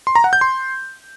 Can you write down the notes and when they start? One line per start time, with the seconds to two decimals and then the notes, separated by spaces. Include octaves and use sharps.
0.07 C6
0.15 A#5
0.24 F#5
0.33 G6
0.41 C6